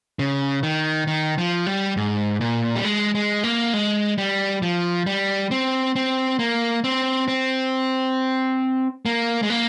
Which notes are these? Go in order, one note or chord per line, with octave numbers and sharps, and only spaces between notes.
C#3
D#3
D#3
F3
G3
G#2
A#2
G3
G#3
G#3
A#3
G#3
G3
F3
G3
C4
C4
A#3
C4
C4
A#3
G#3
A#3